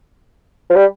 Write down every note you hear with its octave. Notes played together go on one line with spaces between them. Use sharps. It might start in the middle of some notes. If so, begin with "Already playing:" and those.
F3
G3